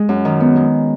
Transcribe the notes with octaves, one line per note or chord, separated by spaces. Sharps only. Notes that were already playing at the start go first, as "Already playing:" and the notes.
Already playing: G#3
F#2
D#3
B3
G#3